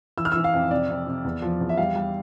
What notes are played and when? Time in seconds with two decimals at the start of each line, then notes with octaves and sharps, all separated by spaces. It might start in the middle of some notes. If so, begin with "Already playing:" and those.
0.17 E3 E6
0.25 F6
0.32 E6
0.36 E3
0.44 F5
0.53 F2
0.71 C3 D5
0.90 F2
1.07 C3
1.25 E2
1.42 F3
1.60 E2
1.69 E5
1.77 G3 F5
1.96 G3